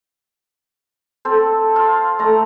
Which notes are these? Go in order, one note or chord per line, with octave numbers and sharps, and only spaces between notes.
C4 A4 C5
F4 F5
A3 A#5